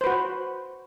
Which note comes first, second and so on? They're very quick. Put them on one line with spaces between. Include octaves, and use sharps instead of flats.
C5 B4 F#4